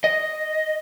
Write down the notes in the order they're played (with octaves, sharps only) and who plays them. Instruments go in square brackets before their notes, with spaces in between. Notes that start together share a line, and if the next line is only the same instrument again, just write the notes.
[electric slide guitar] D#5